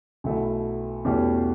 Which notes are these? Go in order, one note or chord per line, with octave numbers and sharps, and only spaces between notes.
B1 B2 F#3 A3 E4
E2 B2 A3 C#4 G4